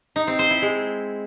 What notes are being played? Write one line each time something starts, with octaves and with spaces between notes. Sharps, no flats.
D#4
C4
C5
E4
G#3